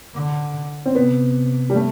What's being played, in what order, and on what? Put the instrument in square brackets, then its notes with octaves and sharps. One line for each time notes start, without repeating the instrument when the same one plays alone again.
[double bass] D3
[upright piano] C4
[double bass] C3 [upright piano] B3
[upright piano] G3
A3